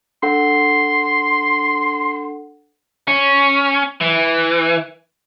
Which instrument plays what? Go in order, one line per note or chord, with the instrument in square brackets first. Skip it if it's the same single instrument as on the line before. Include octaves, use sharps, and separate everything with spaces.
[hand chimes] D4 A4 F#5 [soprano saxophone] C6
[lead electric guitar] C#4
E3